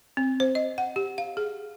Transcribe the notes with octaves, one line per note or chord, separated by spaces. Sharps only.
C4
C5
D#5
F#5
G4
F5
G#4